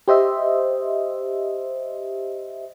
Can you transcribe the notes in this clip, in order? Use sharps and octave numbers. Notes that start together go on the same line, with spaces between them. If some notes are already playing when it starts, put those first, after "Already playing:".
G4 C5 D#5 E5